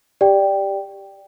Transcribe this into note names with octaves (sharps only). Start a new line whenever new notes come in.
G4 D5 G5